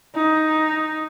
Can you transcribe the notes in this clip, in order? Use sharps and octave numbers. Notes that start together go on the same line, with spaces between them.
D#4